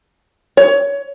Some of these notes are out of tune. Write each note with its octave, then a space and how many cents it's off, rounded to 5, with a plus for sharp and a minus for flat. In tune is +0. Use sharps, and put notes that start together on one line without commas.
C#5 +20